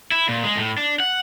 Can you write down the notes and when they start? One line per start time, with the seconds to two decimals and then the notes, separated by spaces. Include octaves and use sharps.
0.12 E4
0.29 A#2
0.44 G#3
0.57 A2
0.78 D4
1.00 F#5